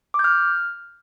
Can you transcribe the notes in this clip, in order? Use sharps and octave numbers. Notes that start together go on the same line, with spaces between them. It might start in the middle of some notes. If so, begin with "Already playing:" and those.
D6
G6
F6